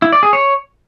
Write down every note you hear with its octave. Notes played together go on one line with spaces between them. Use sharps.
E4
D5
G#4
C#5